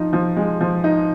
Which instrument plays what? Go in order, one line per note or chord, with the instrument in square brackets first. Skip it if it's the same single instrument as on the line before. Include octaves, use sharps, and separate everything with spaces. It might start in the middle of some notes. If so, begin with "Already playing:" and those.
Already playing: [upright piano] F3 D#4
F3
G#3
F3
D#4